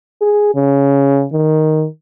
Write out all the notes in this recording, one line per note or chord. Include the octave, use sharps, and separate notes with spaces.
G#4
C#3
D#3